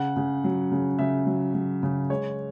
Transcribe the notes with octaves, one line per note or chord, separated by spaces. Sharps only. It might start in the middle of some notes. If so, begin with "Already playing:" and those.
Already playing: C#3 F#5
C#3
F#3
C#3
C#3 E5
F#3
F#3
C#3
G#3 C#5